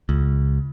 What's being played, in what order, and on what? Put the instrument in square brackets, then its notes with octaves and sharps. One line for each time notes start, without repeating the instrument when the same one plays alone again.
[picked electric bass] C#2